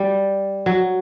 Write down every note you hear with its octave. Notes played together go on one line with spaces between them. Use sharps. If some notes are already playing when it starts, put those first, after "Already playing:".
Already playing: G3
F#3